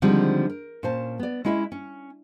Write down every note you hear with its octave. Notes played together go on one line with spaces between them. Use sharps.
D3 D#3 F3 G3 G#3 C4
A#4
A#2 C#4 C5 A5
B3 D5
G#3 C#4 E4 D#5 E5
C#4